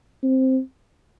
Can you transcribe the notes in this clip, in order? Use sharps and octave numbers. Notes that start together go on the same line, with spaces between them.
C4